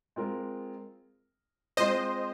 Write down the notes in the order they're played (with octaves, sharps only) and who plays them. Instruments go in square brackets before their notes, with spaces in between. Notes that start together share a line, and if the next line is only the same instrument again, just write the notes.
[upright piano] G#3 C4 F4 A#4
[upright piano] G#3 C4 F4 [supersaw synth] C5 D#5